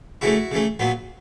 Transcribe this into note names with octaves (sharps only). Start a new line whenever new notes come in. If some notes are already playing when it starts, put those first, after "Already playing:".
C#3 E3 A3 E4 F#4
C#3 E3 A3
A#2 F#3 B3